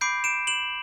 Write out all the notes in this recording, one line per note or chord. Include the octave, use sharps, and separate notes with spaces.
B5 D6 G6 C7 D7
D7 E7
E7 F#7